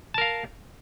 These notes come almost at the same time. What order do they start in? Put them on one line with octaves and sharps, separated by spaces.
A5 A#4 F5